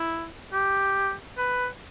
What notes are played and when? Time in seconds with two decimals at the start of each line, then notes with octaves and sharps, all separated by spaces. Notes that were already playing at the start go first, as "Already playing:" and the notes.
Already playing: E4
0.53 G4
1.38 B4